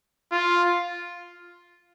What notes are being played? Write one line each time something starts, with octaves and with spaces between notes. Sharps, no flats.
F4